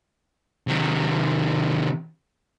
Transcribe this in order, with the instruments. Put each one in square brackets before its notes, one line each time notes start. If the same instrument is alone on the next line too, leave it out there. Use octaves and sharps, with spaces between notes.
[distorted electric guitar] C3 D#3